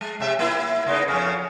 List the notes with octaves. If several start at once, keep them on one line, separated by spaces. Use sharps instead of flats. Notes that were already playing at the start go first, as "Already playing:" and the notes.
G#3
C3 E5
A#3 E4
C#3 B3 D#4
F2 C#3 C#4